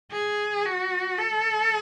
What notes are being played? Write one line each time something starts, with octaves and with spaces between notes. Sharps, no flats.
G#4
F#4
A4